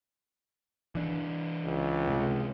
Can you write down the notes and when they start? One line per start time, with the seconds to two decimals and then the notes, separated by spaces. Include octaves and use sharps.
0.95 E3 D4
1.65 C#2
2.08 C3 G#3